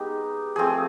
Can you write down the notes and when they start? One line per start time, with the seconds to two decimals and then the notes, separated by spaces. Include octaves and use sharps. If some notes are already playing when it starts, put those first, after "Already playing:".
Already playing: G#3 B3 D#4 G4
0.56 F3 A3 C4 G#4